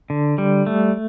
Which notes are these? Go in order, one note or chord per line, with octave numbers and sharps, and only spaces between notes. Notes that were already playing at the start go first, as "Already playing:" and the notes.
D3
G3
A3